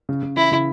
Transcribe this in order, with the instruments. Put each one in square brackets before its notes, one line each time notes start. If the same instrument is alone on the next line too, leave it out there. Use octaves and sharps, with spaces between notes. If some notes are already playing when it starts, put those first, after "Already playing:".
[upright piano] C#3
C#3
[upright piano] E3 [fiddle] E4
[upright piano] C#3